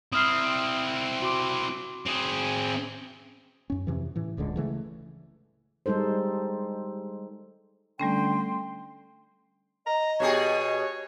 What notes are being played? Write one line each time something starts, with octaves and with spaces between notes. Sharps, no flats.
C4 E4 D#6 F6 C7
F#4 C6 D6
C4 G#4
F#2 C#4
F2 C3 E3
A2 E3
D1 C#2 D3 G#3
C#3 E3 A3
G3 G#3 D#4 A4 C5
D3 G3 A3 C#4 G5 C6
D#5 A#5
B2 G4 G#4 C#5